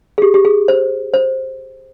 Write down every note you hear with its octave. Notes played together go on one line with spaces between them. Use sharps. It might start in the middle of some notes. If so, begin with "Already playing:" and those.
G#4
G4
G4
G#4
C5
C5